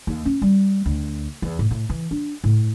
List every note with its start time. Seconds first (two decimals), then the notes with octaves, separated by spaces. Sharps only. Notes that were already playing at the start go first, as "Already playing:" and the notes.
0.07 D#2
0.25 C#4
0.42 G3
0.86 D2
1.42 E2
1.59 A2
1.71 A2
1.90 E3
2.11 D4
2.44 A2